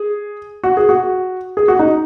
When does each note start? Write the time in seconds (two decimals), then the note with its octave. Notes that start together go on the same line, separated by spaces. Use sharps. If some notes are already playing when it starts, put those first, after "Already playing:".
Already playing: G#4
0.63 F#4
0.77 G#4
0.89 F#4
1.57 G#4
1.68 F#4
1.79 D#4